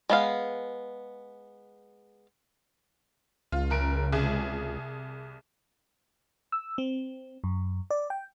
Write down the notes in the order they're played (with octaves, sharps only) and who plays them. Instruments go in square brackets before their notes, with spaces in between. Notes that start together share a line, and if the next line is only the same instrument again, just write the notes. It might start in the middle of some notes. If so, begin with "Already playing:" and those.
[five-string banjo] G#3 B3 F5
[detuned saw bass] C#2 [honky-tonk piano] F4
[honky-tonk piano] F#1 A#4 D7
C2 G#4
[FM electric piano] E6
C4
F#2
D5
G5